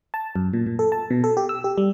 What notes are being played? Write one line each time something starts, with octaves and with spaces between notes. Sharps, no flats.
A5
F#2
A#2
A#2
A4
A5
B2
A4
G4
E6
G4
G3